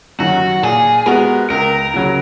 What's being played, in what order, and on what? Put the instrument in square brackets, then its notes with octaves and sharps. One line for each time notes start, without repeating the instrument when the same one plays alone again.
[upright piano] F#2 D#3 F#3 [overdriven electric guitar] F#4
[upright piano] A#2 [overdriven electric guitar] G#4
[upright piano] G#3 B3 F#4 [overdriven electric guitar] A#4
[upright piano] C#2 [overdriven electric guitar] A#4
[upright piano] C#3 F#3